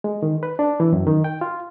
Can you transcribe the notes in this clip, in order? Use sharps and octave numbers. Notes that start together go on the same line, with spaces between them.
G#3
D#3
B4
D4
E3
F#2
D#3
G5
F4